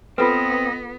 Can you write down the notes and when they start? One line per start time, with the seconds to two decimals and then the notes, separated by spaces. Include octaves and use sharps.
0.18 B3 C4 F4 A4 B4 D#5